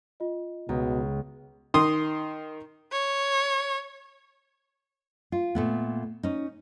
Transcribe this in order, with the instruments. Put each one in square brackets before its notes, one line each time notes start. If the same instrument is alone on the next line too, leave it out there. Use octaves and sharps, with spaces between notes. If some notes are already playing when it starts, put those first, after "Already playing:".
[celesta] F4 D#5
[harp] C#2 [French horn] B2 [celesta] A#5
[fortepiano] D#3 C6 D#6
[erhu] C#5
[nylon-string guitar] F4
A#2 A3 B3
C#4 D#4